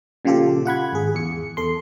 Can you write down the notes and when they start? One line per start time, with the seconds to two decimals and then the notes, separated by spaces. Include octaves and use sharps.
0.25 A#2 C#3 F3 F4 G4 A4
0.65 F4 F#5 B5 G#6
0.93 G#1 G#4
1.15 E2 C#7
1.57 E2 A4 C6